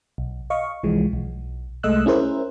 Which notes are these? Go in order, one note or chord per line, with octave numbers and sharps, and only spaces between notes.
B1
D#5 F5 C#6
C2 E3 F3 G#3
B1
C2 G#3 A3 D#5 E6 F#6
C#4 E4 G#4 A#4 C5